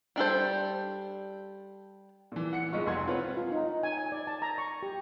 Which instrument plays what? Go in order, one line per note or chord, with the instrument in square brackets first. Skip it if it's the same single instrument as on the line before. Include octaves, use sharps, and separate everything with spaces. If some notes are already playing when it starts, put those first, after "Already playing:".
[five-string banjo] G3 D4 A4 C5
[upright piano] A#2 E3
F#5 C#7
B1 G#3 D#4 F4 C#6
F1 C#2 F#5 C6 G#6
C4 F4 B4 C#5 F#5
[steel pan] F4
D#4
D#4
G#5
G#5
D5
A5
A#5
C#6
G4